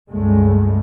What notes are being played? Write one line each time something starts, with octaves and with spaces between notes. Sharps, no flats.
C#2 G2 G#3 A3